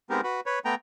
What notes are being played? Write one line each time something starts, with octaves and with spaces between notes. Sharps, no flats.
G#3 B3 C4 D#4 G4 A#4
F#4 B4
B4 C#5
A3 B3 G5 A#5